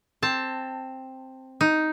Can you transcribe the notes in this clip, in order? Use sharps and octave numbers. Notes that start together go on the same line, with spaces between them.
C4 A5
D#4